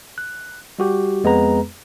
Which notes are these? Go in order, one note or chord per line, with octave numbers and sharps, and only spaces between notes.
F#6
G3 F#4 G4
F2 G#3 B3 G#4 B4 A#5